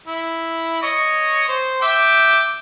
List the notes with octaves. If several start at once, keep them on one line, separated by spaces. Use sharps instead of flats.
E4
C#5 D#5 C#6
C5
E5 G5 D6